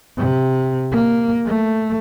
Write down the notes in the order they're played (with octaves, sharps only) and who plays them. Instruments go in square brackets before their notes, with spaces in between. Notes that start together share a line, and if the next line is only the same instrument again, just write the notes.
[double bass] C3
A#3
A3